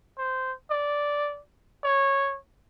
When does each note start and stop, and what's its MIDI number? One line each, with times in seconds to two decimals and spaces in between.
0.18 0.52 72
0.71 1.39 74
1.84 2.36 73